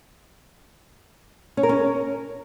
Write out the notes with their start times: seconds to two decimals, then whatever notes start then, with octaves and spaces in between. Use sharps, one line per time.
1.57 C#4
1.63 A#4
1.69 C#4